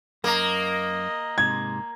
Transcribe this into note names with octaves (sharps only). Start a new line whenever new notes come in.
F#2 A#3 D#5 A#5
G#2 C3 G#6